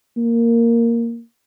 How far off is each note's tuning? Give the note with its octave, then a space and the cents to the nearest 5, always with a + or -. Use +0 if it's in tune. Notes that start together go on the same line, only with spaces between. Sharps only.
A#3 -5